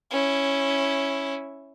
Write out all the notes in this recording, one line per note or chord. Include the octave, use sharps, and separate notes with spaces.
C#4 E4